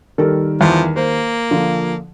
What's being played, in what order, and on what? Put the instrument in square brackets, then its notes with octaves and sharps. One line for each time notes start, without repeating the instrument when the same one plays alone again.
[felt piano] D#3 G3 A#4 [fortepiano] A4
[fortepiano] E2 [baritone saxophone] F3
[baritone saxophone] A#3 [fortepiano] C5
[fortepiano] D3 [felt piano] F3